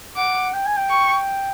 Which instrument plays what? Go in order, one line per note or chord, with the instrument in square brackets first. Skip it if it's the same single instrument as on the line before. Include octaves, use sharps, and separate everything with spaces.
[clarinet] F#5 [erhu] D6
[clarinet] G5
G#5
G5
[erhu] C#6